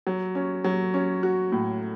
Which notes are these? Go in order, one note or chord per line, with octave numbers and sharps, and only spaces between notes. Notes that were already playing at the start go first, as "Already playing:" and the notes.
F#3
C#4
F#3
C#4
F#4
A2